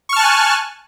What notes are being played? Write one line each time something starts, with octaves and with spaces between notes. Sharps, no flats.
G#5 A5 C#6 F6 F#6